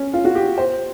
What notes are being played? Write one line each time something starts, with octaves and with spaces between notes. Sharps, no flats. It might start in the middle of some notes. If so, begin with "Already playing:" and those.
Already playing: C#4
F4
F#4
G4
C5